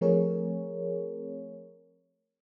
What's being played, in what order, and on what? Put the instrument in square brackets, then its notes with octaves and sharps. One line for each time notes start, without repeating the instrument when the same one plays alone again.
[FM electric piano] F3 A3 C4 G#4 A#4 C#5